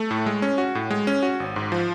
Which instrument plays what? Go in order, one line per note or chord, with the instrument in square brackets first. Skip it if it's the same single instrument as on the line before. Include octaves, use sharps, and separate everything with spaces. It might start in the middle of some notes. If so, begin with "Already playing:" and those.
Already playing: [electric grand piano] A3
A2
G#3
C#4
F#4
A2
G#3
C#4
F#4
G#1
G#2
F3